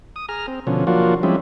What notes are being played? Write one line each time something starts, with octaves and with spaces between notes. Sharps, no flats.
D#6
G#4 A#5 F6
C4
B2 D3 F3 C#4
F3 F#3 A#3 D4 F4 F#4
F3 G3 G#3 C4 C#4 E4